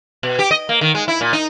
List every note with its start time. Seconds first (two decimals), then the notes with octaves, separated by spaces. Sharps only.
0.23 B2
0.39 G4
0.51 D#5
0.69 A#3
0.81 D#3
0.95 G#3
1.08 E4
1.21 A#2
1.33 D#4